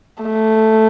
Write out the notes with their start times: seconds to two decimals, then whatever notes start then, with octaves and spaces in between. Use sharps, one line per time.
0.22 A3